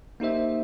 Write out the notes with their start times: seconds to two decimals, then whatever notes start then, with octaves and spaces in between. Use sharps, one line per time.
0.20 A#3 D#4 G4 C5 E5